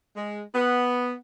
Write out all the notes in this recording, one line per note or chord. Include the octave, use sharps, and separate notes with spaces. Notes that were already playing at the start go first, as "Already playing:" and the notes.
G#3
B3